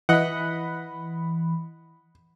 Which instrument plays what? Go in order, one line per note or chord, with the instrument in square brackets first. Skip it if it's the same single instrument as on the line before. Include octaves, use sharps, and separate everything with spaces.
[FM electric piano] E3 B5 [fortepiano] D#5 F#5